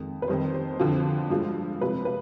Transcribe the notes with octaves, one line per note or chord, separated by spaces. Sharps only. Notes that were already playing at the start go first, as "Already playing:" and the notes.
Already playing: F2 D#3 G#3
B4
F2 D#3 G3 C5
C5
F2 D3 F3
G2 F3 G#3
C3 F3 G#3 B4
B4